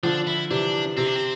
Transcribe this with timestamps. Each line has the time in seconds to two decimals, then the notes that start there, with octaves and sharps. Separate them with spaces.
0.03 D3 F3 D4
0.27 E4
0.50 C3 E3 D4
0.97 C3 C4
1.07 D4
1.16 C4